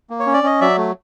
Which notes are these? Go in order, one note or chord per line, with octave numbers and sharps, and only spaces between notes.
A#3
C#5
C#4
D5
C#4 D#5
F#3 D5 E5
A3